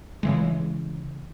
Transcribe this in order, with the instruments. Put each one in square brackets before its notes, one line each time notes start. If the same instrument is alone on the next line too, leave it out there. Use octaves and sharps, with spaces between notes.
[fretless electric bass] C#3 E3 G#3